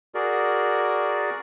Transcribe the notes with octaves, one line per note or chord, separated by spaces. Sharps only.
F#4 G#4 A#4 D5